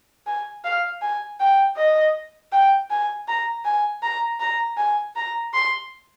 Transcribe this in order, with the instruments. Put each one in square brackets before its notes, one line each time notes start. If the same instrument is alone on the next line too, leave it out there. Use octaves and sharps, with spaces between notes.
[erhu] G#5
F5
G#5
G5
D#5
G5
G#5
A#5
G#5
A#5
A#5
G#5
A#5
C6